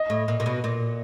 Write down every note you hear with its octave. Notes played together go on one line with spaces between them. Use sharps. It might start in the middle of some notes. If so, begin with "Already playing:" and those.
Already playing: D#5
A2
A#2
A#2
B2
A#2